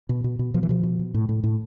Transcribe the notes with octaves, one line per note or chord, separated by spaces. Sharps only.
B2
B2
B2
B2 F3
E3
B2 F3
B2
B2
A2
A2
A2